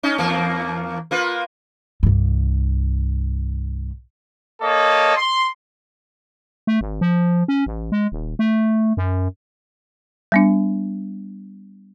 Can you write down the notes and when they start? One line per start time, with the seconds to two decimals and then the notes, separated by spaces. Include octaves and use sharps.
0.03 C#4 D#4
0.18 E2 A#3
1.11 A#3 F4 B4
2.03 C2 G2
4.62 A#3 A4 C#5 D#5
5.16 C6
6.67 A3
6.81 G#1
7.01 F3
7.48 C#4
7.66 A1
7.92 G#3
8.12 D#1
8.39 A3
8.97 F#2
10.32 G3 B3 D4